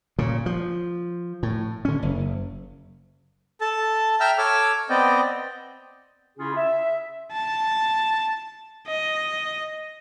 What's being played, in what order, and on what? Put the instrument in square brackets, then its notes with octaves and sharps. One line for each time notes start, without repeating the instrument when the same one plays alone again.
[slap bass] A#2 C#3
F3
A2
D3 C#4
F#1
[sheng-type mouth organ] A4 A5
E5 G5 A#5 E6 F6
A4 C#5 D6 E6 F6
B3 C4 D5 D#5 G5
[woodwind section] C#3 C#4 E4 F4 G#4
E5
[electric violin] A5
D#5